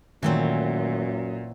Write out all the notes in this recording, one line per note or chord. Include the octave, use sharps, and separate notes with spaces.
F#2 A#2 D#3 E3 F#3 A3 C4